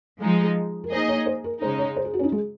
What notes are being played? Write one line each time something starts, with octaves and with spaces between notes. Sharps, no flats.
F3 G#3 D#4
A#4
A#3 D#4 G#4 C5 D#5
C#5
C5
A#4
C#3 G#3 D#4 C5
C#5
C5
G#4
F#4
C#4
D#4
G#3